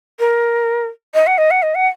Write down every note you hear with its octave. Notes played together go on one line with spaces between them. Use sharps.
A#4
D#5
F#5
D#5
F#5
D#5
F#5